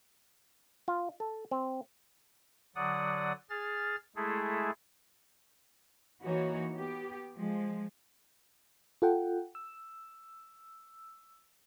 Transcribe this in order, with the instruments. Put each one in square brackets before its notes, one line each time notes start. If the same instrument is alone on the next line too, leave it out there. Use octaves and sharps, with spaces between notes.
[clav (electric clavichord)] F4
A4
C4
[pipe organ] D3 F#3 D5 F#5 D#6
G#4 F6 A6
G#3 A3 E4 G#4 A4
[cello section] E3 A#3 D#4 F#4 C#5
B3 G4
F3 G#3
[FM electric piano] F4 A4 F#5 G5
E6